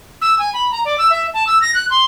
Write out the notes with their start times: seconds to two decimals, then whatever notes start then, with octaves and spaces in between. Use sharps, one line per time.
0.22 E6
0.39 G#5
0.54 B5
0.72 A#5
0.85 D5
0.98 E6
1.10 E5
1.34 A5
1.47 E6
1.62 A#6
1.75 F#6
1.90 C6